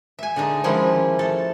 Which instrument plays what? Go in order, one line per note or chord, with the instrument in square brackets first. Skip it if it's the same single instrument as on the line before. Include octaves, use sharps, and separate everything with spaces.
[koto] E5 G#5
D3 G#3 D4 D#4
D#3 F3 G3 G#3 C#4 E4
A3 A4